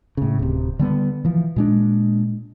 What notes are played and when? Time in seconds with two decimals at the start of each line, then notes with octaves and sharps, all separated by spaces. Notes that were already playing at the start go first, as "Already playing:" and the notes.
0.17 A2 C#3
0.39 D1 C3
0.79 D3 G3 B3
1.25 E3 F3
1.56 A#2 G#3 D4